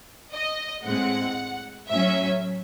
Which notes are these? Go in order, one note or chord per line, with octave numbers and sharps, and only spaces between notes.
D#5
A2 G#3 C4 F#5
A2 F#3 C#4 E5